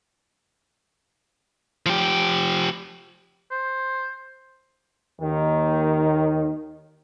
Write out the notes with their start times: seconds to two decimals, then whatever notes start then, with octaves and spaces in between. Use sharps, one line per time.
1.86 F3 G4
3.51 C5
5.21 D#2 D#3